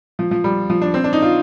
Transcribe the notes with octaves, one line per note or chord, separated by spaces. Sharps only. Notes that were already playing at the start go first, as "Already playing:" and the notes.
F3
F3
G3
F3
D4
C4
D4
D#4
F4